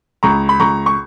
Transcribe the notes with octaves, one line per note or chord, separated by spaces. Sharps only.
C#2 A#5 C#6
B5
C#2 A#5 C#6
C#6